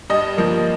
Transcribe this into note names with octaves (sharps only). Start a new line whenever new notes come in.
G2 D#5
F3 A#3